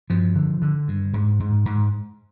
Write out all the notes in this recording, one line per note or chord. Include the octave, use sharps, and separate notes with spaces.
G2 F3
D3
D3
G2
G#2
G#2
G#2